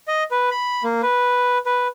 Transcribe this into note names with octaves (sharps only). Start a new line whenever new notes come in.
D#5
B4
B5
A#3
B4
B4